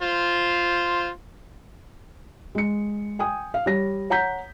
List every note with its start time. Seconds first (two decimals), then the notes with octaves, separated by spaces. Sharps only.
0.02 F4 C5
2.55 G#3 C#7
3.19 G5 G#5 D#6
3.54 F5
3.66 G3 C#5 A#6
4.10 C#5 F#5 A#5 G6 B6